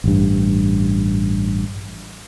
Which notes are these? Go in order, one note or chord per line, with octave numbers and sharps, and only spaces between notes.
A1 G2